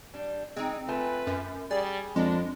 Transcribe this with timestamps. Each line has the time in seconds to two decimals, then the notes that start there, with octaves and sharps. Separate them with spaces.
0.14 G3 D4
0.56 G#3 C4 D#4
0.88 A3 F4 B4 G#5
1.27 F#2
1.71 G3 G#4 D5
2.16 F2 G#3 D4